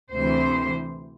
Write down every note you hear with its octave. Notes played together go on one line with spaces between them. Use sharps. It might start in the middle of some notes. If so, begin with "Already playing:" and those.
D2 C3 E3 C5